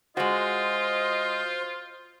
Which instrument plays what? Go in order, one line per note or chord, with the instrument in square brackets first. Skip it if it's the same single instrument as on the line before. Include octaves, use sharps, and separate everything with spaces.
[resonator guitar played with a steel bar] G#3 F#4 [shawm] F4 [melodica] C5 [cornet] D#5